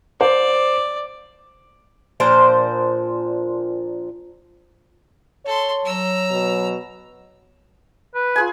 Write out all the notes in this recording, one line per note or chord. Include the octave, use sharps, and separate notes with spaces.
C5 D5
A#2 F3 D4 C5
A4 C#5 C6
F#3 A#5 E6
B2
B4
F4 G#4 G#5